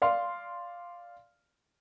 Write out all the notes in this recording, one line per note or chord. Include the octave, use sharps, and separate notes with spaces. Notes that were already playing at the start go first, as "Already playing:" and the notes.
D5 F5 C6